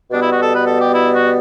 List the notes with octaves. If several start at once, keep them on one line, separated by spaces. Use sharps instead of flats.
B2 G3 B3 D4
E4
F#4
A4
B4
A4
G4
E4
F#4